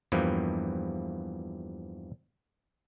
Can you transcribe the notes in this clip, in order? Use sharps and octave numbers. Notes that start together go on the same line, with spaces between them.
E2 G2 E3 F3 A#3